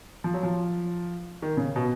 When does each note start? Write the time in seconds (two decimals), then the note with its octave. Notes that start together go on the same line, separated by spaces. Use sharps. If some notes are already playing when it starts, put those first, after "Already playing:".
0.24 F3
0.34 F#3
0.43 F3
1.42 D#3
1.57 C#3
1.76 B2